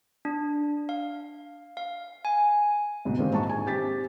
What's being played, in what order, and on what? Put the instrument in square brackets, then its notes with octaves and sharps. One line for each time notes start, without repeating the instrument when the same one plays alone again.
[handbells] D4
F5
F5
G#5
[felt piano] D2 G#2 B2
A#2 D#3 G3 G#3 A#3 C4
A#1 G#2 A5 C#6
G#5
C4 G4 A6 B6